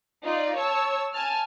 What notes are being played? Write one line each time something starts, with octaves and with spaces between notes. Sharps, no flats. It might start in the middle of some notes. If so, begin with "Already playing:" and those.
D#4 F4 D5
C#5 A5 E6
G#5 A5 F6